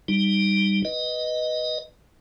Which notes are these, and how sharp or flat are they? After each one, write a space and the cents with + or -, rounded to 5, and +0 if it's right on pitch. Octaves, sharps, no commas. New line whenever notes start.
G3 +5 D#4 +0
B4 +0 D#5 +0